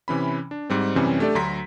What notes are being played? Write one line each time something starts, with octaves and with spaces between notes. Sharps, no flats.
C3 E3 C#4 B5
D4
G#2 G3 C4
F#2 C3 E3 G3 C4 C#4
A3 D4 G4 A4 D5
D2 F#3 A#5 C6 B6